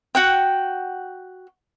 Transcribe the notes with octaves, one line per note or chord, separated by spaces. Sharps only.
F#4 F#5 G5